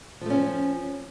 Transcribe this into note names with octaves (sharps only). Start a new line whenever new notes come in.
F3 A3 C4 C#4